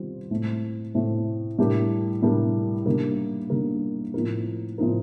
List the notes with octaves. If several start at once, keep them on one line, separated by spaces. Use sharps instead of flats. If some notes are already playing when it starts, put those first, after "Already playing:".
Already playing: D#3 G3 C4 F4
A2 A3 C4
A2 A3 C4
A2 G3 D4 G4 A#4
A2 G3 D4 G4 A#4
D3 G3 A#3 D#4 A#4
D3 G3 A#3 D#4 A#4
A2 F3 C4 D#4 A#4
A2 F3 C4 D#4 A#4